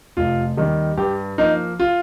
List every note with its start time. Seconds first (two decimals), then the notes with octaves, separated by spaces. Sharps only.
0.17 F1 F4
0.57 D#2 D#3 G3
0.97 G2 G4
1.38 F3 A#3 D#4
1.80 F4